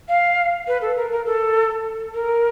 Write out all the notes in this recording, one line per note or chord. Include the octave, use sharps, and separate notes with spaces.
F5
B4
A4
A#4
A#4
A4
A#4